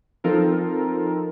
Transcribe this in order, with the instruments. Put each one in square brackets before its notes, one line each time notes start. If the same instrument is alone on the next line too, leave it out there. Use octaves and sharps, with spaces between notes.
[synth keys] F3 C4 D#4 F4 A4 A#4